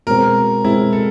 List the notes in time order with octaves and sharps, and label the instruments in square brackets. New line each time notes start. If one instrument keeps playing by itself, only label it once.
[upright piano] B2 G#3 C4 [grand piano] A#4
[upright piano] B2 G#3 C4 [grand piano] E4
[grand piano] A4